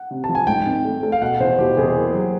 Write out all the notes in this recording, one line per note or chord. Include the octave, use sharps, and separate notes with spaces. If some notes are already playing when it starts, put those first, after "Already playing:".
Already playing: F#5
C3
A5
F3
G#5
G#2 G5
G#1
A3
A3
F5
B2 F#5
E2 C5
B2 G4
E2 G#4
A#3
F#3